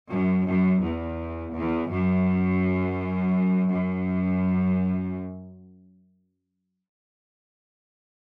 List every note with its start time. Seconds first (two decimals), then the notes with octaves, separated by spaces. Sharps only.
0.11 F#2
0.47 F#2
0.83 E2
1.54 E2
1.90 F#2
3.70 F#2